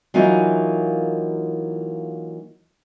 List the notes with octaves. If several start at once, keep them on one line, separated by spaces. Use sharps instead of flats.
E3 F#3 A#3 D#4 F4